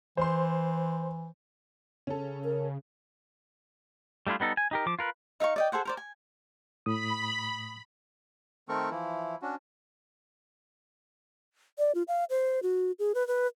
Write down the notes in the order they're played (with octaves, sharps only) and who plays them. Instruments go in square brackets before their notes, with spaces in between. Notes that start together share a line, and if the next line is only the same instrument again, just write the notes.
[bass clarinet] E3 [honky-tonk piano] C5 C6
[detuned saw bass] C#3 [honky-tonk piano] C#4 A4
[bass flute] A#4
[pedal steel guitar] G3 A3 D4 E4 F4
G3 B3 D#4 A4
G#5
D#4 G4 A#4
F3 D6
F4 A#4 B4
[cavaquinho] D#4 E5 F5 C#6
D5 D#5 G5
G#4 A4 C5 F#5
A#4 C5 D5
G#5
[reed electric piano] A2 D#6 [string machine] B5
[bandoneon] D#3 A3 C4 A4 A#4 C#6
E3 F3 E4
C#4 D4 F#4
[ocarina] D5
F4
F5
C5
F#4
G#4
B4
B4